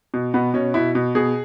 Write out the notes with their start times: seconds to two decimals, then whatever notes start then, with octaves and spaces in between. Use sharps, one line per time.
0.14 B2
0.34 B2 B3
0.54 B2 C#4
0.74 B2 E4
0.95 B2
1.15 B2 G#4